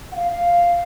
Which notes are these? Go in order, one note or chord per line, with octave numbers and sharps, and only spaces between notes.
F#5
F5
F5